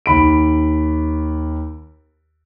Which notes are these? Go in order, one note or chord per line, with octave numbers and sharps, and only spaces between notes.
D#2 B5 D7